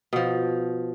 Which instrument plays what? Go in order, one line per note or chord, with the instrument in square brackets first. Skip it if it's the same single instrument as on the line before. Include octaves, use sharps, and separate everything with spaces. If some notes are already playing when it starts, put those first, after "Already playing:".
[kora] B2 F3